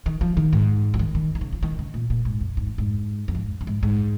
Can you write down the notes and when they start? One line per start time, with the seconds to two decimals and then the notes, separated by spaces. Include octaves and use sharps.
0.06 D#3
0.21 F3
0.37 D#3
0.53 G#2
0.94 F3
0.99 D#3
1.15 D#3
1.35 D#3
1.41 C#3
1.53 F3
1.63 D#3
1.79 C#3
1.94 A#2
2.10 A#2
2.25 G#2
2.41 F2
2.57 G#2
2.67 F2
2.78 G#2
3.28 F2
3.35 G#2
3.61 F2
3.67 G#2
3.83 G#2